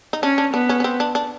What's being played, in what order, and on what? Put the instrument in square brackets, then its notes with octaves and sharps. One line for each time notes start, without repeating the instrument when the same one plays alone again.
[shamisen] D#4
[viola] C#4 [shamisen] D4
[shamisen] D4
[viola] B3 [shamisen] D4
[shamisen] C#4
C#4
C4
D4
D4